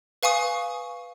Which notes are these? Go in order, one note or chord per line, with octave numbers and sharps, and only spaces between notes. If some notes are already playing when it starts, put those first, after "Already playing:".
B4 F5 G#5 C#6 D#6